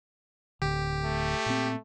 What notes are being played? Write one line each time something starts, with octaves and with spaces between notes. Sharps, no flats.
D1 D3 G4
A3
A#2 C4